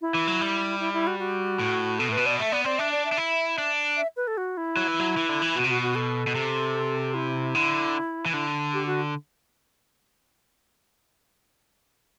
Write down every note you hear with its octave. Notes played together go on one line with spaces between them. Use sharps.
E4
E3
F#3
G3
E4
E4
F#4
F#4
A2
B2 A4
A2 B4
B2
D5
A3 E5
B3 D5
C4 D5
D4 E5
D5
E5
D4
E4
D4
E5
B4
A4
F#4
E4
F#3
E3
F#3
E3
D3
E3
B2 F#4
C3
B2 F#4
F#4
A4
B2
C3
E4
D3
E3
D3
G4
F#4